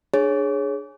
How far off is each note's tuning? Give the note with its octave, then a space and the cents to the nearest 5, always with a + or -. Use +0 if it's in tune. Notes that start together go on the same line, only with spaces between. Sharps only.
D4 +20 G#4 +5 C#5 -5